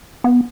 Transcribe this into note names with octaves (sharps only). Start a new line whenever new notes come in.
B3